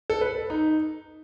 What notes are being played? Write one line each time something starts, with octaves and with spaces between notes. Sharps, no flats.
A4
B4
D#4